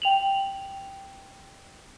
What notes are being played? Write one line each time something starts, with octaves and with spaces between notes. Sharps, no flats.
G5 F7 F#7